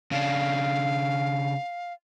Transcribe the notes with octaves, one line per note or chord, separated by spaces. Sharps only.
C#3 D4 F5